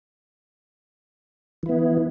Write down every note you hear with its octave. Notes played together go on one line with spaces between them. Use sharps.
E3 B3 E4